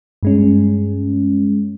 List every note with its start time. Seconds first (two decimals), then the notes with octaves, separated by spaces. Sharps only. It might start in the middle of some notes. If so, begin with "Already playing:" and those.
0.23 G2 G#3 C#4